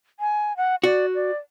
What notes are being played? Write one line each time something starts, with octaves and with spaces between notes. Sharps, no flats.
G#5
F#5
F#4 D5
D5